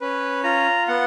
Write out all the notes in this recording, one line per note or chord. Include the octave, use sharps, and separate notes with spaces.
C#4 B4
F4 A#5
B3 F#5